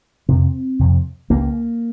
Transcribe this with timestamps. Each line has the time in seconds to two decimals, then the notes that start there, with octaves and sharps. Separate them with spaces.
0.28 F2 C3 C4
0.79 F2 C3
1.30 C#2 C#3 A#3